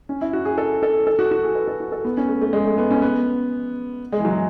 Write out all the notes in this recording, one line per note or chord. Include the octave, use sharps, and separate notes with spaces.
C#4
E4
F#4
G#4
A4
A4
A4
F#4
F#4
G#4
B4
A4
F#4
A4
B3
C#4
A3
A3
G#3
A3
B3
C#4
B3
G#3
E3
F#3